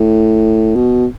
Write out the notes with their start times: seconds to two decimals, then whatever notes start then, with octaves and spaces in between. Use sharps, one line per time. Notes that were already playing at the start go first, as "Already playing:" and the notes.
Already playing: A2
0.75 B2